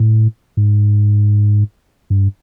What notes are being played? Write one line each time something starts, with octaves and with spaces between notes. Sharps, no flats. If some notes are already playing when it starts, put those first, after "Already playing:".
Already playing: A2
G#2
G2